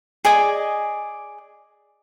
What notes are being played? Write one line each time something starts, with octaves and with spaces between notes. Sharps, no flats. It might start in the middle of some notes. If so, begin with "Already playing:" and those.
G#4 D5 D#5 G#5